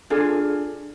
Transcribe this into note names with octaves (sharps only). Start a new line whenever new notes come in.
D4 F4 G#4 A4